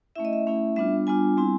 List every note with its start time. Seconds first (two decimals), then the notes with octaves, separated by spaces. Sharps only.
0.16 A3 C#4 E4 E5
0.25 D#5
0.33 E5
0.47 A3 C#4 E4
0.76 G3 B3 D4 F4 E5
1.07 G3 B3 D4 F4 G#5
1.37 G3 C4 E4